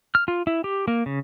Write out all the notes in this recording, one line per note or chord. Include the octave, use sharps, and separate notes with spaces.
F6
F4
E4
G4
A#3
C#3